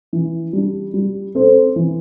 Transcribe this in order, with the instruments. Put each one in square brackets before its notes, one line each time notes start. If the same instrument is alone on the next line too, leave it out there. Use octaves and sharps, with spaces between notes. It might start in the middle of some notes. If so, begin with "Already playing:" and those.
[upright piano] E3
G3 D4
G3
C4 A4 C5
E3